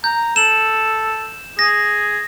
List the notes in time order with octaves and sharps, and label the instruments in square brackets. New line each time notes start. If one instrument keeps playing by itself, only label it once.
[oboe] A#5 [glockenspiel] G6
[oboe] A4 [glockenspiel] E7 F#7
[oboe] G#4 [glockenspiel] A#6